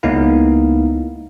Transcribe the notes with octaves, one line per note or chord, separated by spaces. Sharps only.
C#2 A#3 B3 D#4 E4 F5